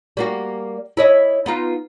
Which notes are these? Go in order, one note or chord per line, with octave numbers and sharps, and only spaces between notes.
G3 A#3 F#4
E4 C#5 D#5
B3 D#4 F4